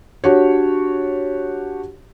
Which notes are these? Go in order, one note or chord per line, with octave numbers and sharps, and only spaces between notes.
D4 F#4 G4 C#5